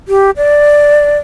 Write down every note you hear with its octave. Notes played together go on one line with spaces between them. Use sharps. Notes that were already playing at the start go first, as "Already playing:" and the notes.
G4
D5